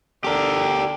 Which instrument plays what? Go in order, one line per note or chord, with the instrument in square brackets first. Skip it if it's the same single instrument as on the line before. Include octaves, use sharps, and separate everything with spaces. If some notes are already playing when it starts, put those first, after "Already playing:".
[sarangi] D3 [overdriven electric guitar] G4 A#4